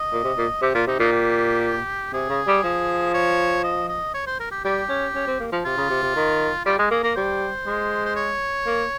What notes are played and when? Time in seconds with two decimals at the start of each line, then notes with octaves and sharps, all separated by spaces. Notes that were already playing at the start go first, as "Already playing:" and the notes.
Already playing: D#5
0.12 A#2
0.24 C3
0.38 A#2
0.62 C3 G4
0.74 A#2 F4
0.87 C3 D#4
0.99 A#2 D#4
1.12 G4
2.13 C3 G#4
2.29 C#3
2.47 G3
2.63 F3
3.14 C#5
3.64 D#5
3.88 D#5
4.14 C#5
4.27 C5
4.40 A#4
4.51 G4
4.65 G3 G4
4.89 C#4
5.15 C#4
5.27 C4
5.40 A#3
5.52 F3
5.65 C3 F4
5.77 C#3
5.90 C3
6.03 C3
6.16 D#3
6.65 G3 F4
6.78 G#3 G#4
6.91 A#3 G#4
7.03 A#3 A#4
7.15 G3 C5
7.66 G#3
8.05 C5
8.16 C#5
8.66 A#3